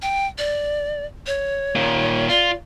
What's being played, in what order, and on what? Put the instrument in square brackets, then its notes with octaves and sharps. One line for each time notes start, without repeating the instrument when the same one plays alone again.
[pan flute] G5
D5
C#5
[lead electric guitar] A#2 D#3
[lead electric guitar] F4 [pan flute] D5